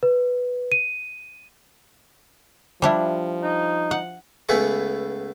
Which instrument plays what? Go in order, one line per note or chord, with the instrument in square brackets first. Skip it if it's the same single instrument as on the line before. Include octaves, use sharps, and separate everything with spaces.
[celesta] B4
D#7
[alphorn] F3 [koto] G3 D4 E4
[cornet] D#4
[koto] F#5
[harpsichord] C#2 A3 B3 E4 G#4 C#6